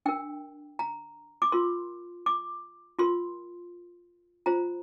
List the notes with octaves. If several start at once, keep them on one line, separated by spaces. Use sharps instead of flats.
D4 A#4 G5
A#5
D6
F4 A#4 C6
D6
F4 A#4 C6
F4 C5 A#5